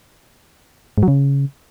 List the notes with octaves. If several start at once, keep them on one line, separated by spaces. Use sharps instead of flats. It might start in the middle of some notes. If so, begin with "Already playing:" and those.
G#2
F#3
C#3